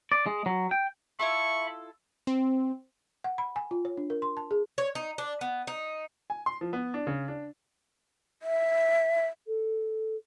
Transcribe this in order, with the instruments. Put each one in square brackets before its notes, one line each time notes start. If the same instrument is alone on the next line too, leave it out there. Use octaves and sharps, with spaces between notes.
[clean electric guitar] D5
G#3
F#3
G5
[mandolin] E4 F4 A4 [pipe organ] E5 B5 [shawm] C#6
[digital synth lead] C4
[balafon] F#5
B5
G#5
F4
C#5
D4
A#4
C6
A5
G#4
[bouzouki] C#5
D#4
D4
B3
D#4
[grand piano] G#5
C6
F3
B3
D4
C#3
D4
[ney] E5
[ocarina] A4